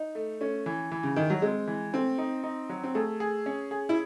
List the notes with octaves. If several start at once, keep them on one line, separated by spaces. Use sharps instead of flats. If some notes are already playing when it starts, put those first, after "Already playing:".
Already playing: D#4
A3
A3 C#4
E3
E3
C#3
D#3 E4
F#3
G#3 C4
E3
A3 C4
D#4
D#4
F#3
C4
A3 G#4
G#4
C#4
G#4
E4